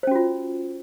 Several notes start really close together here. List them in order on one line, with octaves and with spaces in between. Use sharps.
C5 C#4 F#4 F4